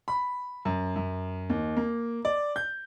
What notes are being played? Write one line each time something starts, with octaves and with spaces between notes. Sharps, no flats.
B5
F#2
F#2
D#2
A#3
D5
G6